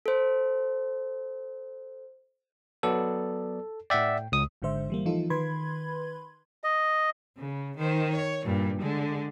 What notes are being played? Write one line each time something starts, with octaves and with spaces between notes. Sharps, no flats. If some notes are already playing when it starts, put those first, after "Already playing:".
A4 C5
F#3 B3 A4 D5
A2 D5 E5 F#5 G5
C#2 D#6
G#1 G#2 D3 G#3 C5 E5
E3 G3 A#3
E3 F3 D#4 F4 A4
D#3 B4 B5 C6 G#6
D#5
C#3
D#3 C5
C#5
G2 A#2
D3 G#3